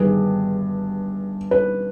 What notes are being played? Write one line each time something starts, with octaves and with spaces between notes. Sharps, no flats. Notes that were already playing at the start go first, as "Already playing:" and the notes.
Already playing: G1 G2 D#3 G#4 B4
B4